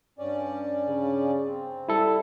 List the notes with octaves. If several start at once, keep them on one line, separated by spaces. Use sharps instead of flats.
G2 C#4 D5
C#3
C4
G3 E4 A4